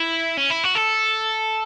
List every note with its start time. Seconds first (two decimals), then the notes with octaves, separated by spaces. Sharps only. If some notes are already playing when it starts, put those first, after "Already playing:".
Already playing: E4
0.37 C#4
0.50 E4
0.64 F#4
0.75 A4